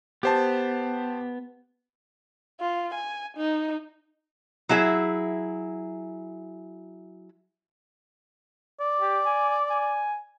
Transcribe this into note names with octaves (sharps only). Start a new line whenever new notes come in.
B3 G4 C5 A5
F4
G#5
D#4
F#3 E4 G#4 C5 E5
D5
G4
G#5
G#5